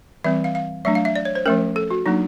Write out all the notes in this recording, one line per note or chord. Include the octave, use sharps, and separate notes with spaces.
E3 G3 C4 E5
F5
F5
F#3 A3 D4 E5
F5
E5
D5
C#5
C5
F3 A3 C#4 A#4
A4
F#4
F#3 A#3 D4 D#4